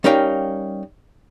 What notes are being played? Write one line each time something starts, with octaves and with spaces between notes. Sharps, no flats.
G3 C#4 D#4 A#4 F5 G5